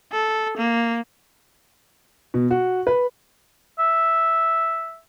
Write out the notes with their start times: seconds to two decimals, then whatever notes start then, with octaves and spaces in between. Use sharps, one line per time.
0.12 A4
0.57 A#3
2.34 B2
2.51 F#4
2.87 B4
3.79 E5